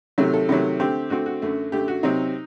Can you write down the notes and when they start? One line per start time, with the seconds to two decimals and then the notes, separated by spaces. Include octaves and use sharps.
0.18 C3 D#3 F#3 A3
0.34 A4
0.49 C3 D#3 F#3 A3
0.80 D3 A3 C4 G4
1.10 D3 A3 C4 F#4
1.26 F#4
1.42 F#2 D3 A3
1.72 F#2 D3 A3 G4
1.88 F#4
2.03 C3 F#3 C4 D#4